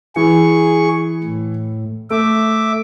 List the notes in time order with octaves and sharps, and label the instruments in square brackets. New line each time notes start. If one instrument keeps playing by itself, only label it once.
[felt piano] E3 [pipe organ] G#4 C#6
[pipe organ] A2
[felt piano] A3 [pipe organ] E5 D6